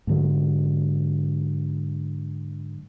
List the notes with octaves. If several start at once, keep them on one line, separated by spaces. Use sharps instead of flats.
G#2 D3 F#3